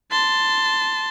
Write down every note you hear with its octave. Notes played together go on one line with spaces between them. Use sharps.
A5 C6